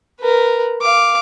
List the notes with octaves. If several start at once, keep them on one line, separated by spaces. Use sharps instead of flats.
A#4 B4
F5 D6